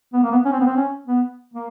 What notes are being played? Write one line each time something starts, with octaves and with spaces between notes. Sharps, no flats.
B3
A#3
B3
C#4
C4
B3
C4
C#4
B3
A#3